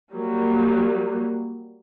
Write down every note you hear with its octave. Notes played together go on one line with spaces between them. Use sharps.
F#3 G3 A#3